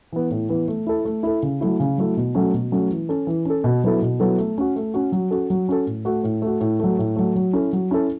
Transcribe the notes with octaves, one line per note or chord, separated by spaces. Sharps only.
E3 B3
A2
E3 B3
A3
E4 A4
A3
E4 A4
C#3
F#3 A3 E4
C#3
F#3 A3 E4
B2
F#3 A3 C#4
B2
F#3 A3 C#4
E3
C#4 A4
E3
C#4 A4
B2
F#3 B3 E4 A4
B2
F#3 B3 E4 A4
A3
C#4 F#4
A3
C#4 F#4
F#3
C#4 F#4 A4
F#3
C#4 F#4 A4
A2
A3 F#4
A2
A3 F#4
A2
F#3 A3
A2
F#3 A3
F#3
C#4 E4 A4
F#3
C#4 E4 A4